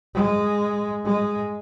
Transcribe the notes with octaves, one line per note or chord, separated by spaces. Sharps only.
G#3
G#3